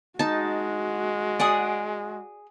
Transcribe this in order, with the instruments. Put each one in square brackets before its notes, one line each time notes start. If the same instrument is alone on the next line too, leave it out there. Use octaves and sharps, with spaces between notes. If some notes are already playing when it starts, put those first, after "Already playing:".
[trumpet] G#3 [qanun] D#4 A5 [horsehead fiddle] F#4
[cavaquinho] G#4 G#5 D#6 [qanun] D5 F#5